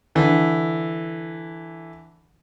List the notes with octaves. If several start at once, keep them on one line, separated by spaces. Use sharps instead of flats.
D3 E3